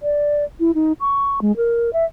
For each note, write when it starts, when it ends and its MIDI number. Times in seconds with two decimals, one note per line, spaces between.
0.02 0.44 74
0.60 0.71 64
0.75 0.92 63
1.00 1.40 85
1.42 1.55 56
1.57 1.90 70
1.93 2.05 76